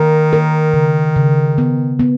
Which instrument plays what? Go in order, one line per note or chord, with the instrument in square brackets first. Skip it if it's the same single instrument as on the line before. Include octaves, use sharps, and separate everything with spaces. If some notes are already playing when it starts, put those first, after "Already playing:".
Already playing: [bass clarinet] D#3 [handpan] A#4
[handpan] A#4
C#3
C#3
B3
B3